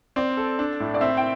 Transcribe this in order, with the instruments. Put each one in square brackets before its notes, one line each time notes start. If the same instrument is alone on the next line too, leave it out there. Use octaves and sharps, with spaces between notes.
[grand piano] C4 [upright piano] D5
[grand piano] A4
D4
A2
[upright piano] D5
[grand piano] C4 [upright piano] E5
[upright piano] G5